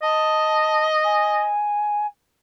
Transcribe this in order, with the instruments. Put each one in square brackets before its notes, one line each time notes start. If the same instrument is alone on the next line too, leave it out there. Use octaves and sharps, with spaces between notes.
[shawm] D#5 [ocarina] A5
[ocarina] G#5